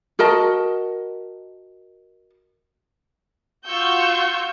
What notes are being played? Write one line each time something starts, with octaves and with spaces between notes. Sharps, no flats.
F#4 A#4 D#5 A5
F4 F#4 C#6 E6 G6